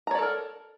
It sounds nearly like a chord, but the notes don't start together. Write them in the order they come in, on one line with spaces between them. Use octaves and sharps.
A#5 C#5 D5 A4 A#4